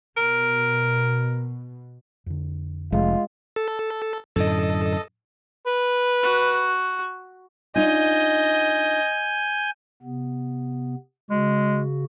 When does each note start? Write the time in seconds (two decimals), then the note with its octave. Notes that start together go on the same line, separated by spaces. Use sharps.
0.17 B2 A#4
2.26 F2 D3
2.93 F1 G#3 F4
3.56 A4
4.36 F#2 A2 D3 A4 D#5
5.66 B4
6.23 F#4
7.76 D4 D#4 F4 D#5 G#5 G6
10.02 C3 B3
11.30 C#3 G#3 F#4